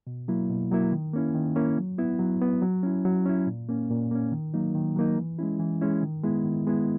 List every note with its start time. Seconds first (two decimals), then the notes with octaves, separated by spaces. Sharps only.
0.07 B2
0.28 F#3 A#3 E4
0.49 B2
0.71 F#3 A#3 E4
0.92 D#3
1.13 A#3 C#4 E4
1.34 D#3
1.56 A#3 C#4 E4
1.78 F#3
1.98 B3 E4
2.19 F#3
2.41 B3 E4
2.62 F#3
2.83 C#4 E4
3.05 F#3
3.25 C#4 E4
3.47 A#2
3.69 A#3 C#4
3.90 A#2
4.11 A#3 C#4
4.32 D#3
4.54 F#3 A#3 D#4
4.75 D#3
4.96 F#3 A#3 D#4
5.18 E3
5.39 G#3 C#4 E4
5.60 E3
5.81 G#3 C#4 E4
6.03 D#3
6.23 G#3 B3 E4
6.45 D#3
6.67 G#3 B3 E4